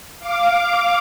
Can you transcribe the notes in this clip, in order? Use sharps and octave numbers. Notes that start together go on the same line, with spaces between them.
F5 D6